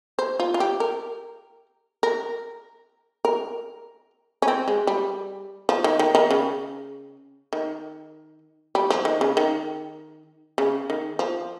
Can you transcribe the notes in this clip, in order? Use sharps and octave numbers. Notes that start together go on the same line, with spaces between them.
C5
F4
F4
G4
A#4
A#4
A#4
C#4
C4
G#3
G3
F3
D#3
D#3
D#3
C#3
D#3
G3
F3
D#3
C#3
D#3
C#3
D#3
F3